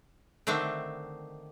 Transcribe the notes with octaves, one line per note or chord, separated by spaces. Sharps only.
D3 D#3 A3 C4 D4